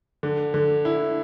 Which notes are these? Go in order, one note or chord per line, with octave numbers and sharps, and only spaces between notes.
D3
D3
E4